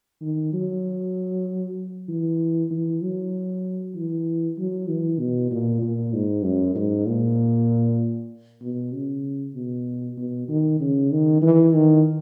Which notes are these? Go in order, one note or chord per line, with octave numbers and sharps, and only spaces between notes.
D#3
F#3
E3
E3
F#3
E3
F#3
E3
B2
A#2
A#2
G#2
F#2
G#2
A#2
B2
C#3
B2
B2
D#3
C#3
D#3
E3
D#3